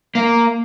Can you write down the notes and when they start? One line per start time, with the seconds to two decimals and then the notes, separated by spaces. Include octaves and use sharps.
0.15 A#3